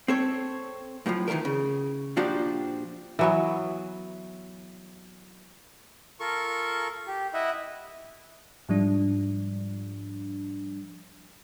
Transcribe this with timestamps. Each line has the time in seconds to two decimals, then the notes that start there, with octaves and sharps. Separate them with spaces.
0.08 C4 A4 C#5
1.06 F#2 A2 D3 F3
1.28 D#3 E3 G#3 A3 A#4
1.45 C#3
2.17 A#2 F3 D4 F#4 G4
3.19 E3 F#3 B3
6.20 F4 A4 A#4 C#6
7.07 G4
7.34 E4 D#5 E5 F#5
8.69 G#2 F3 G3 D4